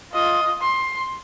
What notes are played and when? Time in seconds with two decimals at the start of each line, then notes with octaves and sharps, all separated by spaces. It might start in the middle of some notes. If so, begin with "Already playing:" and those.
0.13 F4 D#5
0.61 C6